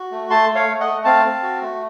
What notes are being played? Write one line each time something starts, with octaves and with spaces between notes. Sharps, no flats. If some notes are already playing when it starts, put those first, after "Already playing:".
Already playing: F#4
A3
A3 A5 C6
A3
C#5 F5
A3
D#5 F#5
A3
C4 F5 A5
C4
F#4
A3